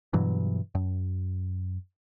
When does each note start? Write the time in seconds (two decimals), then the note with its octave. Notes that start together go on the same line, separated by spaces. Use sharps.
0.13 G2 B2 E3 F#3
0.75 F#2